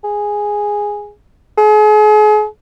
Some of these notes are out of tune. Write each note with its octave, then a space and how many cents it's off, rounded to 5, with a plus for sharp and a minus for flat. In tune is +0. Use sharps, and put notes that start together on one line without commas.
G#4 -5
G#4 +40